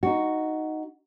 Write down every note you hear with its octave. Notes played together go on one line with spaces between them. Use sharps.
D#4 F#4